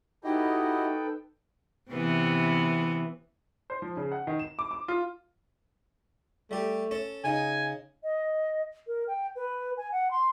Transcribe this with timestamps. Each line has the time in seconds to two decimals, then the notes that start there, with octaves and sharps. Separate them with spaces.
0.24 D#4 E4 F#4 G4 A4 B4 D#5 G5
1.91 C3 E3 B3
3.70 C5
3.82 F3
3.97 C#3
4.12 F#5
4.27 D#3
4.39 E7
4.59 D6
4.71 D6
4.88 F4
6.51 G3 A3 G4
6.91 C#4 A4 C#6
7.24 C#3 D#4 G#5
8.03 D#5
8.87 A#4
9.08 G5
9.36 B4
9.77 G#5
9.92 F#5
10.11 C6